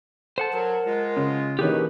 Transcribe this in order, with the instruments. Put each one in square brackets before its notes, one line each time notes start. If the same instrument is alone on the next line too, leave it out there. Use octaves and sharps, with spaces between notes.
[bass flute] A4 [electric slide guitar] C5 F#5 A5
[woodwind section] F#3 [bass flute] A#4
[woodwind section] G#3 F4
[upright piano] C#3
[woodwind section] B2 [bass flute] D#3 [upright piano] E3 A#3 C#4 [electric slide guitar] G4 G#4 B4